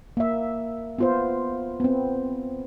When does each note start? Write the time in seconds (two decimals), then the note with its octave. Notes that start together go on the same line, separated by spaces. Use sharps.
0.17 A#3 E5
0.98 B3 F4 C5
1.80 B3 C4